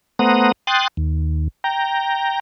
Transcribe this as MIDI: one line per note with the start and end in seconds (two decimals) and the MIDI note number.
0.19 0.52 57
0.19 0.52 59
0.19 0.52 72
0.19 0.52 78
0.19 0.52 82
0.19 0.52 87
0.67 0.88 79
0.67 0.88 84
0.67 0.88 87
0.67 0.88 90
0.67 0.88 93
0.97 1.48 39
1.64 2.40 79
1.64 2.40 82